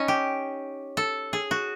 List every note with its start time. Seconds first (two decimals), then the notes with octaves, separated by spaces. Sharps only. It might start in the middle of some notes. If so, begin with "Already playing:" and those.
Already playing: C#4 D#4
0.08 G4
0.97 A4
1.33 G#4
1.51 F#4